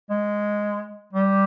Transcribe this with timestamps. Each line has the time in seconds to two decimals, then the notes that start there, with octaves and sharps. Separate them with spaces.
0.10 G#3
1.13 G3